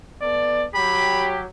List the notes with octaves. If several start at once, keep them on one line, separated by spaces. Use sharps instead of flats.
B3 A4 D5
F#3 G4 B5